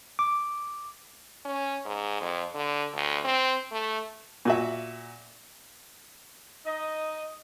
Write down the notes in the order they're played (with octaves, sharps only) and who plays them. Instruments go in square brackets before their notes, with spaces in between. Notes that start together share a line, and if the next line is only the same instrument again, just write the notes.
[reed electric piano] D6
[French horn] C#4
G#2
F2
D3
D2
C4
A3
[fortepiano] A#2 F#4 E5
[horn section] D#4 D#5